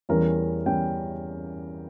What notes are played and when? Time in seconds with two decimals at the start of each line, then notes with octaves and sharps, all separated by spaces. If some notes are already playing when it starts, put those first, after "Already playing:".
0.09 E2 E3 G3 C#4 A#4
0.66 E2 E3 G3 C#4 G5